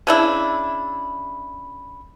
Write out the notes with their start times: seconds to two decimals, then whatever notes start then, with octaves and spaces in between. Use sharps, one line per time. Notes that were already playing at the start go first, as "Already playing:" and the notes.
0.07 C#3 D4 E4